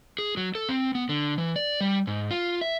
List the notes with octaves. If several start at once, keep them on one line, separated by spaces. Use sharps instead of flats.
G#4
F#3
A4
C4
B3
D3
E3
D5
G3
G#2
F4
E5